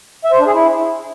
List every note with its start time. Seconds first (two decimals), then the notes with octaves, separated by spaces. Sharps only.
0.25 E5
0.32 C5
0.39 D4
0.47 G#4
0.54 E4